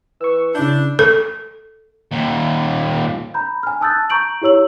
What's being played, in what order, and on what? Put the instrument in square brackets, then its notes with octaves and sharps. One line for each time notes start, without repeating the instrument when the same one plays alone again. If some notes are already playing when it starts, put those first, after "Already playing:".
[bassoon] E3 [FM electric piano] C#6 E6
[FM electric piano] C#3 G6 [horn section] D4 [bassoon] E4
[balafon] A4
[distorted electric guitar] D#2 A#2
[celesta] A#5 B5 G6
G#5 F6
A5 D#6 E6 F#6 G6 A6
A5
A#5 C#6 G6 D7 F#7
E4 G4 C#5 E6 F#7